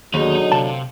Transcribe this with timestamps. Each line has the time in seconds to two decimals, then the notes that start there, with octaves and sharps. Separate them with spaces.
0.14 D#2 B2 D3 F#3 D#4 G#4 D#5
0.52 C3 F5 A5